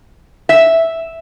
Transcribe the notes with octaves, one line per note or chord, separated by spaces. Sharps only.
E5